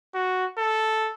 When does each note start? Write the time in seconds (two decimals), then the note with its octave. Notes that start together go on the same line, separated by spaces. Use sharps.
0.15 F#4
0.58 A4